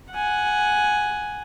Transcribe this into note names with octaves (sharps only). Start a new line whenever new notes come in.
F#5 G#5